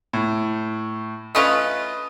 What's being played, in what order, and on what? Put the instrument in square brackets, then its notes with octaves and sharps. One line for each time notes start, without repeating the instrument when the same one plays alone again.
[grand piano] A2
[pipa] A3 C#4 F4 [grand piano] B4 D#5 D#6